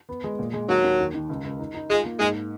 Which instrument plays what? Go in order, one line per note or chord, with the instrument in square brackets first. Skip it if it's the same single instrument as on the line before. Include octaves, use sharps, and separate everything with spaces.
[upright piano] B3
G#3
A#2
G#3
[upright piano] D#2 [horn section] F#3
[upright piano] D#2
D#3
D#3
C#2
C#2
D#4
D#4
[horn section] G#3 [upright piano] F4
[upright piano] A#3
[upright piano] G#2 [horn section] G#3